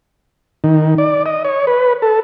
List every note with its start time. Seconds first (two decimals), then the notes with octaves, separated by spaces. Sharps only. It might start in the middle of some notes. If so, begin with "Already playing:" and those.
0.64 D#3
0.98 D5
1.26 D#5
1.45 C#5
1.67 B4
2.02 A4